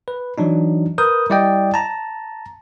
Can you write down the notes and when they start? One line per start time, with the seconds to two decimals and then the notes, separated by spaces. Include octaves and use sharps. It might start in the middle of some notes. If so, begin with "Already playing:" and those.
0.08 B4
0.38 E3 F#3 D4 D#4
0.98 A#4 B4 D#6 G6
1.30 G3 E4 D5 D#5 G5
1.74 A5 A#5